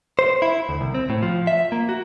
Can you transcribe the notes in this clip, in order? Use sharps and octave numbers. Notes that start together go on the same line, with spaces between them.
C5
E4
D2
C2
C4
A2
F3
E5
A#3
F#4